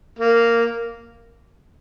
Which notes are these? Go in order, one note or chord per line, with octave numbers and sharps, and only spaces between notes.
A#3